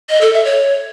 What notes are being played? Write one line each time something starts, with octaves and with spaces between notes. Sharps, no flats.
D#5
A4
E5
C#5